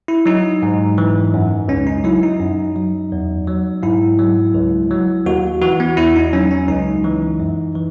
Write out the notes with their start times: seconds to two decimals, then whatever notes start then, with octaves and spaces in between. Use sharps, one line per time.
0.08 E4
0.26 F#3 D#4
0.62 G#2
0.98 E3
1.34 F#2
1.68 C#2 C#4
1.87 D#4
2.04 F#3 E4
2.23 D#4
2.40 F#2
2.76 F#3
3.12 E2
3.47 F#3
3.83 G#2 E4
4.19 F#3
4.54 C#2
4.91 F#3
5.26 D#2 F#4
5.61 E3 F#4
5.80 B3
5.97 E2 E4
6.16 D#4
6.33 F#3 C#4
6.51 C#4
6.68 C#2 D#4
7.04 E3
7.40 F#2
7.75 E3